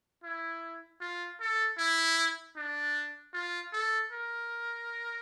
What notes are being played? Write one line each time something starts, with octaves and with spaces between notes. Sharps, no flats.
E4
F4
A4
E4
D4
F4
A4
A#4